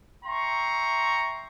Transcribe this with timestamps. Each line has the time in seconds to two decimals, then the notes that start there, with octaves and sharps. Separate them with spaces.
0.25 E5 G5 A#5 C6 C#6